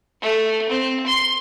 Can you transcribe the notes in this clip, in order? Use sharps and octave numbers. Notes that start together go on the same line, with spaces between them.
A3
C4
C6